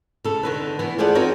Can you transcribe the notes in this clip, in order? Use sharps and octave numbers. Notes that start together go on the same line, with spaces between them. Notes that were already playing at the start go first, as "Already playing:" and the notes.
C#3 A4
D3 D#3 B4
E3 B3
F4 G#4 A4 C5 D5 F#5
C4 D#4 F4 F#4 A#4 C#5